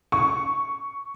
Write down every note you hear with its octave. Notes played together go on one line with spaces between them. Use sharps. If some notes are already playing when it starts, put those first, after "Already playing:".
C#6